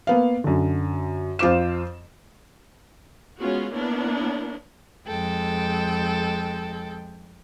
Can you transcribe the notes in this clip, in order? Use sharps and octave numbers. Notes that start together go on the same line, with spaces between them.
A#3 B3 F5
F#2 D3
F2 F4 C5 D6 E7
G#3 B3 C#4 F4 F#4
A#3 B3 C#4 D4 E4 A#4
F2 G#3 A4 G5